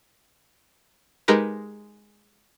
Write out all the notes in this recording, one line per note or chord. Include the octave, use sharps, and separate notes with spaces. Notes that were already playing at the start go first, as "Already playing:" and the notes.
G#3 D#4 G4 A#4 B4